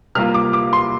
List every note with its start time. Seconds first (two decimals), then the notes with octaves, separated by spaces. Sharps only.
0.15 C3 G3 A#3 F4 F6
0.34 D6
0.53 D6
0.73 C6